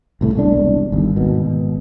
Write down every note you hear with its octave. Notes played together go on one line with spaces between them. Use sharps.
C2 A2 E3 A3
E1 C2 D4
G1 D#2
G#1 B2